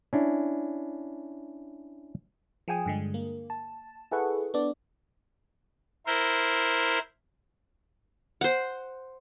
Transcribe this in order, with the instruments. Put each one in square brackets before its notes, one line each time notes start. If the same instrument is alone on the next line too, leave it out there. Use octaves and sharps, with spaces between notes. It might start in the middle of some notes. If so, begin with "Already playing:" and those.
[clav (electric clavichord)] C#4 D4 E4
[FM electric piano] F3 G#4 G5 G#5 D#6
G2 D3 G#3
A#3
A5
E4 G#4 A4 B4 F#5 C#6
B3 D4 D5
[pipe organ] E4 A#4 C5
[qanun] C5 F#5